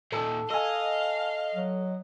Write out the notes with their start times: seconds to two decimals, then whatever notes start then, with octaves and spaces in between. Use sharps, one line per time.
0.12 A#2 D#3 A4
0.51 A4 D#5 F5 G#5
1.55 F#3